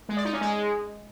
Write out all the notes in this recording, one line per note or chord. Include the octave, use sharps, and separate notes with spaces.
G#3
D5
D#4
C#4
G#3